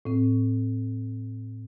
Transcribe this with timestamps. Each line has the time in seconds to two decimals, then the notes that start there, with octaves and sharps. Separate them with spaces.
0.05 A2 C4